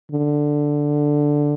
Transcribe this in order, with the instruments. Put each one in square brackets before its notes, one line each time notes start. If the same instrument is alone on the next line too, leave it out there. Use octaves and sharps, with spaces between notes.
[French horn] D3